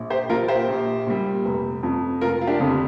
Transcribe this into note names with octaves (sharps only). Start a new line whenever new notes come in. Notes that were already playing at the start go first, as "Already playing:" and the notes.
Already playing: A#1
G4 C5
A#2 F3 F4 A#4
G4 C5
A#1
A#2 G3
F1
F2 F3
F1 F4 A#4
F4
D4 G4
F2 D3 F3